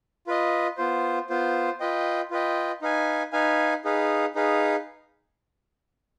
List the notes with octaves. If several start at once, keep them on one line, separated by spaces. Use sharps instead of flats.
F4 B4 D#5
B3 F4 C5
B3 F4 C5
F4 B4 D#5 G5
F4 B4 D#5 G5
D#4 B4 F5 G#5
D#4 B4 F5 G#5
D#4 G#4 B4 F5
D#4 G#4 B4 F5